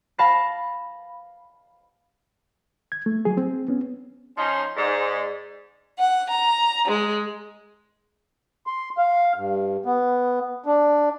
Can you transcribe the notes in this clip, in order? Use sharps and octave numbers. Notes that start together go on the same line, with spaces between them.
F5 A5 B5 A#6 C7
G#6
A3
F#3 G#4
C4
B3 C#4
F3 C#4 D#4 C6
G#2 D5
F#5
A#5
G#3
C6
F5
G2
B3
D4